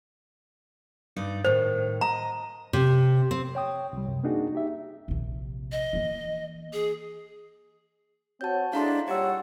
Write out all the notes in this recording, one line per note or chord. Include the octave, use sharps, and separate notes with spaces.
G2 D#4 D5
A2 D#3 C5
D#5 A#5
C3
C4
C#5 G5 D#6
C2 G3
C#2 F#2 C3
A#3 C4 D4 D#4 F#4 G#4
D#4 G4 E5
A#1 C3
D#5
E3 A#3
G#4
C4 F#4 C#5 A5 G6
G#3 D4 E4 A4 F5 A#5 C6
A#2 G3 G4 C#5 F#5 E6